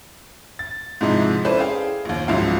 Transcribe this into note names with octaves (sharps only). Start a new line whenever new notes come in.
A6
G#2 C3 F3 G#3 D#4 E4
C#4 E4 A4 B4 C5 D5
G#4 F5 G5
A#1 D#2
C#2 G#2 F3 F#3 E5 F5